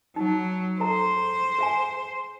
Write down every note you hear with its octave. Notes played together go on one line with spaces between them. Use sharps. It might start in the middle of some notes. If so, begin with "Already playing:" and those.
F#3 D#4
G#4 A4 C5 A#5
G#4 F5 G#5